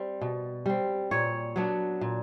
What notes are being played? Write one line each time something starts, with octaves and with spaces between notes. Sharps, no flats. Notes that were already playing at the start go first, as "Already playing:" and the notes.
Already playing: G3 C4
B2
G3 C4
A#2 C#5
F#3 B3 D4
A#2